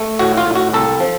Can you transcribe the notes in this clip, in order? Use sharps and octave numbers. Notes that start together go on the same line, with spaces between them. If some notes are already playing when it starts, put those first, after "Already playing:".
Already playing: A3
A2 F#4
F4
A2
F#4
C2 A4
F3